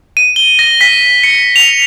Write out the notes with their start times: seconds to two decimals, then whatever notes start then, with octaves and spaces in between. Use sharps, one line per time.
0.17 D#7
0.36 G7
0.59 A#6
0.81 B6
1.24 C#7
1.56 F7